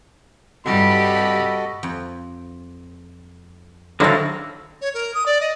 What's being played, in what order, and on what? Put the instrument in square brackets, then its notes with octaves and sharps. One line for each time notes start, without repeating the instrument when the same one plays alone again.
[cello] G2 G4 [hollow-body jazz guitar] C3 G3 [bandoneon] F#4 A4 D#5 [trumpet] B5
[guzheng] F2
[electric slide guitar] D3 D#3 F#3 [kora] C4 A4 D5 [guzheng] E4 F5
[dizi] C#5
A#4
D#6
D5
D#5